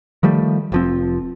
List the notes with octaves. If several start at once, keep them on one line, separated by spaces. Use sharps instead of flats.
D#3 F3 G3 A3
F1 F3 C4